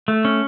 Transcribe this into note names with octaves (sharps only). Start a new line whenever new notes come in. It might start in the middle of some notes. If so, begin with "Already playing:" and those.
A3
C#4